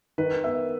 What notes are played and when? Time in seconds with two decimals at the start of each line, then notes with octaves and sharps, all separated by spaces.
0.18 D#3 B4
0.44 B3 E5